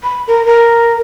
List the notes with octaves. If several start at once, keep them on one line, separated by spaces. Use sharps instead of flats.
B5
A#4
A#4